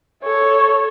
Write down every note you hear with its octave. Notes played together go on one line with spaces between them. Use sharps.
A4 C#5